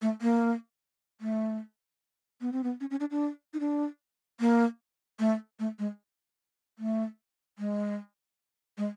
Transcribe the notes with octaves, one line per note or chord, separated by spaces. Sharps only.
A3
A#3
A3
B3
C4
B3
C#4
C#4
D4
D4
D#4
D4
A#3
A3
A3
G#3
A3
G#3
G#3